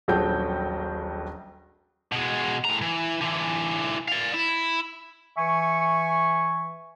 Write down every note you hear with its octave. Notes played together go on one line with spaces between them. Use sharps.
D#1 A#1 F#3 A4 G5 G6
B2 G#3
A2 A#5
E3
D3 E3
D5 F5
E4
E3 E5 G#5 C#6